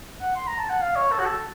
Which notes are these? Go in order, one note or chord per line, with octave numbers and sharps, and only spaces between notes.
F#5
C6
A#5
A5
F#5
F5
C#5
A4
F#4
A4